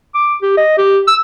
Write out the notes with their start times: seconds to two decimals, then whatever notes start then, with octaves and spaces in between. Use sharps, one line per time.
0.15 D6
0.42 G4
0.57 D#5
0.78 G4
1.07 E6